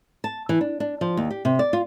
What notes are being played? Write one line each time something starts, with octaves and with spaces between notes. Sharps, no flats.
A5
E3
D4
D4
F3
D#2
G4
C3
D5
F4